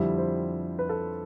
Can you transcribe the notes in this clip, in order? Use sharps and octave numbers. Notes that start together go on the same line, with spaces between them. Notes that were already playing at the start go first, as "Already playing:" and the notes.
Already playing: F2 D3 G3 C4 E4 E5
C5
B4
A4